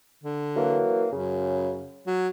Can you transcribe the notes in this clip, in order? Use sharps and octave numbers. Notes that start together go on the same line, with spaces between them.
D3
E3 F#3 A#3
F#2 C#3
F#3